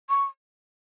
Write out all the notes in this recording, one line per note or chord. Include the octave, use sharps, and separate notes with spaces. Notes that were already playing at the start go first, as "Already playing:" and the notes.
C#6